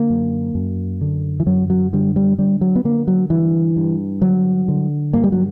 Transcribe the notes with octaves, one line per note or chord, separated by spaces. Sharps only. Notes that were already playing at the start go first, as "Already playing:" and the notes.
Already playing: D3 A#3
F#2
F#2
D3
E3
F#2 F#3
F#3
D3 G3
G3
D3 G3
F#3
B3
D3 A#3
F#3
G2 E3
G2
D3 F#3
D3
G2 A#3
G3
F#3